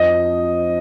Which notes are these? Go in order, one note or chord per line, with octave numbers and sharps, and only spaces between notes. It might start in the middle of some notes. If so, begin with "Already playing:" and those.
Already playing: F2 D#5